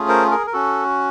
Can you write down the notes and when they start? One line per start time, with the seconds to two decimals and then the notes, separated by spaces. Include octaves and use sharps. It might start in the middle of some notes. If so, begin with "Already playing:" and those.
Already playing: A3 C#4 F4 G#4
0.09 A#4 C5
0.31 G#4 A#4
0.47 A#4
0.53 C#4 F#4 A4